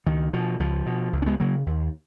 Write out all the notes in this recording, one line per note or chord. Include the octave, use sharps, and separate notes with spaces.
C#2 D#3
B2 F3
C#2 F3
B2
C#2
C#4
G#3 B3
C#3 F#3 A#3
D#2